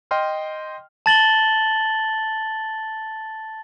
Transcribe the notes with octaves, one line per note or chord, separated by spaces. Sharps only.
D#5 G5 C6 F6
A5 A6 F#7 G7